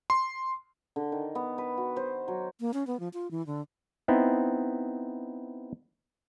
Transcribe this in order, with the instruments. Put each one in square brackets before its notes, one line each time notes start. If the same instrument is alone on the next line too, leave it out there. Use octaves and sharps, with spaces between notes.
[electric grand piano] C6
[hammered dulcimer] D3
D#3
B3
B4
F#4
C5
F#3
[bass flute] A#3
C#4
B3
F3
F4
E3
D3
[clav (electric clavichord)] B3 C4 D#4 E4